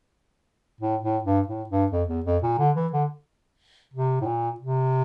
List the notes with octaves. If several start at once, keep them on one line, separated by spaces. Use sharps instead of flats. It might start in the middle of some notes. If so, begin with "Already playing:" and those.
A2
A2
G2
A2
G2
F2
E2
F2
A#2
D3
E3
D3
C3
A2
A#2
C3